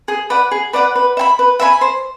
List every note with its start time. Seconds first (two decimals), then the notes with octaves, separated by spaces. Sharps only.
0.08 G#4
0.30 B4 D5 F#5
0.51 G#4
0.73 B4 D5 F#5
0.95 B4
1.17 E5 G#5 B5
1.39 B4
1.60 E5 G#5 B5
1.81 C5